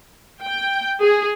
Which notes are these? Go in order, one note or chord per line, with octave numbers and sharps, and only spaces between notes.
G5
G#4